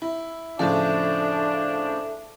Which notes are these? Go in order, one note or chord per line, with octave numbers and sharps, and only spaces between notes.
E4
A2 C#3 F3 D4 A4 E5 A5